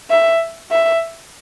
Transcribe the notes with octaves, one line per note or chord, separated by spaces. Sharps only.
E5
E5